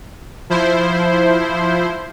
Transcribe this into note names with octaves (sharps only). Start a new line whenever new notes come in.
F3 E4 C5